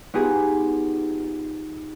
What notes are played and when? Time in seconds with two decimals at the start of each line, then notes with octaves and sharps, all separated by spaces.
0.14 B3 D#4 F4 G4 G#4